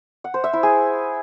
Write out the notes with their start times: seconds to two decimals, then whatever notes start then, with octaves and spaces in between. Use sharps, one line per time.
0.24 F#5
0.34 C5
0.44 E5
0.53 E4
0.63 G#4